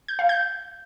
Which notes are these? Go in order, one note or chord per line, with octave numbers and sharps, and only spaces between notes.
G6
F5
G6